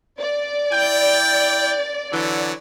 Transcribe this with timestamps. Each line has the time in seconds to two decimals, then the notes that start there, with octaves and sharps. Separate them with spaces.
0.19 D5
0.72 E4 G5
2.11 D3 E3 F#3